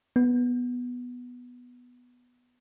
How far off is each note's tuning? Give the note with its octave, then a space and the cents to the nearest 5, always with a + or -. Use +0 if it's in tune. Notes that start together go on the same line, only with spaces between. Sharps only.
B3 -5